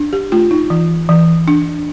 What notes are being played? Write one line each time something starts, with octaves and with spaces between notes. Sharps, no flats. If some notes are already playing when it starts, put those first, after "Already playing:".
Already playing: D4
G4
A3 F4
D#4
E3
E3
D4